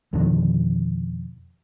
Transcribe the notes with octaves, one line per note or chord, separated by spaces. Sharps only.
F2 B2 D3 D#3